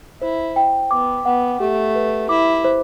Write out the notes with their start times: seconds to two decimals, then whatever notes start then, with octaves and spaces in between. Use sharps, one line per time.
0.21 E4 C5
0.56 G5
0.91 B3 D6
1.25 B3 F#5
1.60 A3 G4
1.95 B4
2.29 E4 D6
2.64 C5